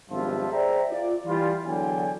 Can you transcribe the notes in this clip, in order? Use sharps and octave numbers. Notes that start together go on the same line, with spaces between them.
G#1 G2 B2 F3 F4 E5
G#4 C5 D5 E5 G5 A#5
F4 D5
E3 G3 F4
E2 D3 F#3 D5 G5 G#5